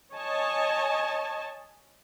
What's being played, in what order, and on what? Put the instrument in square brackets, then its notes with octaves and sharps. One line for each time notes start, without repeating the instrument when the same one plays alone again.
[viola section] C#5 D#5 G#5 A5